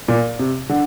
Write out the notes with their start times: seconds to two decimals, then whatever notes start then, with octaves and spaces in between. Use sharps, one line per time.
0.08 A#2
0.39 C3
0.69 D3